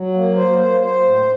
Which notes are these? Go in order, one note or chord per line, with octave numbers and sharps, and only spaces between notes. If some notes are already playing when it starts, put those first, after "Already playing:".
Already playing: F#3
A#3
C5
C5
C5
A2